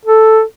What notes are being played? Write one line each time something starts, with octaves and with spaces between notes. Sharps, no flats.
A4